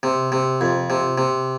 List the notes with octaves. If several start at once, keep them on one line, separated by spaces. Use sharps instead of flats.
C3
C3
F2
C3
C3